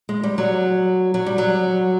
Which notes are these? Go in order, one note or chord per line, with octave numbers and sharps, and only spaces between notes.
G#3
G3
F#3
F#3
G3
F#3